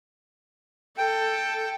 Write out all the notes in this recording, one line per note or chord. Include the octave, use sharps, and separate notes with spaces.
A4 G5